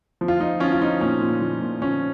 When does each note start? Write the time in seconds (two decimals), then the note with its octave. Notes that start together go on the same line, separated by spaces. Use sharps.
0.21 F3
0.28 F4
0.40 F3 D#4
0.60 F3 C#4 F4
0.73 F4
0.81 F3 D#4
1.01 A#2 C#4
1.22 A#2
1.41 F3
1.62 A#2
1.82 F3 C#4